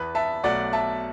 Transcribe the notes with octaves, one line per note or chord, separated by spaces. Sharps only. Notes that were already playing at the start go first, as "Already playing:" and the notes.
Already playing: E2 E3 B3 B4
E5 A5
B1 B2 A3 D5 F#5
E5 A5